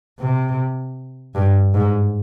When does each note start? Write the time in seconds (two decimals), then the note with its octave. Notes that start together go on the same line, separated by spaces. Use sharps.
0.19 C3
1.35 G2
1.74 G#2